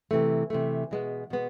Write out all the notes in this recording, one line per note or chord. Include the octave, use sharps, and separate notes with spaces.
C3 E3 A3
C3 E3 A3
B2 G#3 B3
B2 G#3 B3